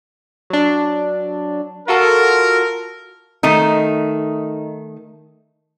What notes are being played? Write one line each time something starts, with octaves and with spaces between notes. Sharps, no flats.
F#3 D4
F4 F#4 A4 A#4
D#3 A3 D#4